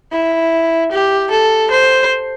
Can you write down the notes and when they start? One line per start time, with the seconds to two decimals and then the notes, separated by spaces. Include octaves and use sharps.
0.12 E4
0.92 G4
1.31 A4
1.71 C5